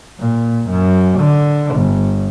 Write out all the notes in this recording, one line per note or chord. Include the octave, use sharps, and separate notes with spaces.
A#2
F#2
D3
G1